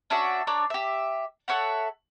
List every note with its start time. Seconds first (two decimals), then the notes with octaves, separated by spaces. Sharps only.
0.10 C#4 D4 F#4 E5
0.47 D4 A#4 C#5 D5
0.70 G4 E5
1.48 A4 C#5 E5 F#5